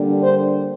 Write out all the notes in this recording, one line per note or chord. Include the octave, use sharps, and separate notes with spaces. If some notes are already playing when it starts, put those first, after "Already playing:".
Already playing: D3 G3 A#3 D4
C5